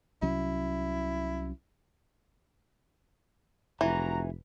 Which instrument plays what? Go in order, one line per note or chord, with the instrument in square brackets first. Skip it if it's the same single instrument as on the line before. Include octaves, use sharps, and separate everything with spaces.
[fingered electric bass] C2 F#3 C#4 [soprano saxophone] E4
[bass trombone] F1 [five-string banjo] E3 [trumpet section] F#4 A#5